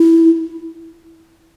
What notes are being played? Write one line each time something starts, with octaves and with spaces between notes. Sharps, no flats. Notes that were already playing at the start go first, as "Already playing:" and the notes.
Already playing: E4